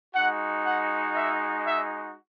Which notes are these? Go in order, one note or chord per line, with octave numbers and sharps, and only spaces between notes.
G#3 D#4 F#4 F#5
F#5
E5
E5